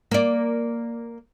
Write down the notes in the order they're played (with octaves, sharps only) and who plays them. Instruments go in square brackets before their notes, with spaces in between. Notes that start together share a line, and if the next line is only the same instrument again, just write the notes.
[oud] A#3 D5